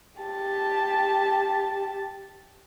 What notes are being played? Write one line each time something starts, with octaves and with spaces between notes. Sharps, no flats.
G4 A5